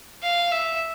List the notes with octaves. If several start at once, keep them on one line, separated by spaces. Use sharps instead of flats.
F5
E5